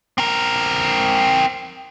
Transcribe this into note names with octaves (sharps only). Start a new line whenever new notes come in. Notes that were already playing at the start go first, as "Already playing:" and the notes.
C4 A#4